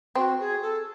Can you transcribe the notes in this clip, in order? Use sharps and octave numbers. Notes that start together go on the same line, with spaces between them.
C4 F#4
G#4
A4